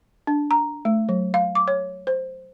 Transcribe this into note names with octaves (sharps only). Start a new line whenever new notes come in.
D4
A#5
A3
F#3
F5
D6
C#5
C5